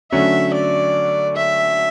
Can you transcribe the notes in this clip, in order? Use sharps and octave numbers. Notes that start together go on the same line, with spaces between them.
D3 F#3 A3 C#4 E5
D5
E5